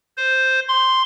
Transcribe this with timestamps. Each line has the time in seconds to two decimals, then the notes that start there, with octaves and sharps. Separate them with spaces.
0.17 C5
0.68 C6